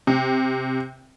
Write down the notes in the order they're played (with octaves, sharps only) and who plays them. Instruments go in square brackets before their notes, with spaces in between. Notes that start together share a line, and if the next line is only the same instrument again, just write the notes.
[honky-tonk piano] C3